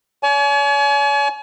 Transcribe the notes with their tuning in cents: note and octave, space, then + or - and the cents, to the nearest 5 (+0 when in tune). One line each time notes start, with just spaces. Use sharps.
C#5 +45 G#5 +40